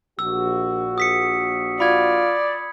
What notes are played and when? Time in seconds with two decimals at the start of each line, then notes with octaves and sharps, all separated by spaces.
0.19 A#1 F#4 E6
0.98 D#6 B6 C#7
1.80 F4 D5 B5 G#6